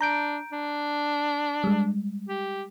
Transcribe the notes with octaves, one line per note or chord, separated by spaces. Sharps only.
D4 A#5 G6 D7
D4
G3 G#3
G4